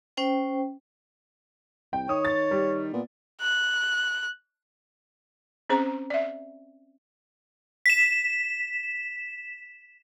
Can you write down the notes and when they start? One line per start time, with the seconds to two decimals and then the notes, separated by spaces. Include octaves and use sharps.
0.17 C#4 C5 G5
1.93 C2 G5
2.09 D#3 C#5 D#6
2.25 A6
2.51 G3
2.93 A#2 B3
3.41 F#6
5.69 C4 C#4 G#4 C5 A#5
6.10 D5 E5
7.86 B6 E7